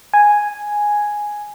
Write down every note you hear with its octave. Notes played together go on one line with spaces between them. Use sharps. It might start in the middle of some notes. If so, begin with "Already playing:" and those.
G#5